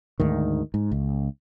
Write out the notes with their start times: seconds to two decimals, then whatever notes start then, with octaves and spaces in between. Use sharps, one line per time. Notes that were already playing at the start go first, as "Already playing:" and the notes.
0.20 D2 G#2 D#3
0.74 G#2
0.92 C#2